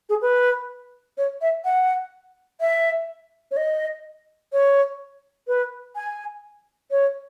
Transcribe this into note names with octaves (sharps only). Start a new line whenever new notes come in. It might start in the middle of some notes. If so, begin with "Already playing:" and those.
G#4
B4
C#5
E5
F#5
E5
C#5
D#5
C#5
B4
G#5
C#5